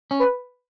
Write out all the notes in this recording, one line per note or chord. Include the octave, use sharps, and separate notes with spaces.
C#4
B4